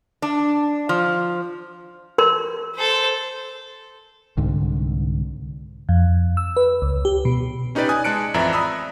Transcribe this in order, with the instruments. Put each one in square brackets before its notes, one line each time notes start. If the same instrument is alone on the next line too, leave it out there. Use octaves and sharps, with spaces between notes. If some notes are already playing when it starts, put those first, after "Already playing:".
[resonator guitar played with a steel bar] D4
F3
[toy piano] A#4 C6
[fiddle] A4 C5
[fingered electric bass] C2 G#2 D3
[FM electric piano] F2
E6
B4
C#2
G4
B2
[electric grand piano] C#4 D#4 G4 B4 D5
G#5 D#6 F#6
G#3 G#4 A5 F#6 C#7 D7
A1 F2 E3 D5 E5 A#5
A#5 B5 D#6 E6 F#6